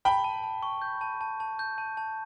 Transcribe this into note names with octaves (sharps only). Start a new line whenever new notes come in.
G5 A5 B5
A5
A5
C#6
G6
A5
A5
A5
G6
A5
A5